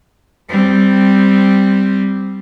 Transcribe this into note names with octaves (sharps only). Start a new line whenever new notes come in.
G3 C4